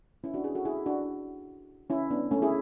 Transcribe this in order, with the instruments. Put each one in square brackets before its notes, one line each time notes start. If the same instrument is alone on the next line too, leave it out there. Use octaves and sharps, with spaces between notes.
[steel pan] C#4 E4
D4 F#4
E4 G#4
F#4 A4
E4 G#4
D4 F#4
C#4 E4
B3 D4
A3 C#4
E4 G#4